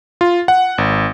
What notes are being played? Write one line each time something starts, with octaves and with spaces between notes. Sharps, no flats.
F4
F#5
G#1